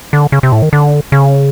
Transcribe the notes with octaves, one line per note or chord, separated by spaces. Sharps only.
D3
C#3
C3
A2
D#3
D3
C#3